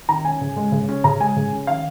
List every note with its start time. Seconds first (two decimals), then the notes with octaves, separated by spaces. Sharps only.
0.09 D#3 A#5
0.25 C#4 G#5
0.41 C#3
0.56 G#3
0.72 C#3
0.89 C#4
1.04 C#3 A#5
1.20 G#3 G#5
1.36 C#3
1.52 C#4
1.67 D#3 F5